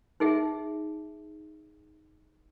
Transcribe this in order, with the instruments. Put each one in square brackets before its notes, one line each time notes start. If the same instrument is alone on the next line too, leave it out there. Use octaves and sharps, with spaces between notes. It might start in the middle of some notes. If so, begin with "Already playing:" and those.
[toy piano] D#4 G#4 E5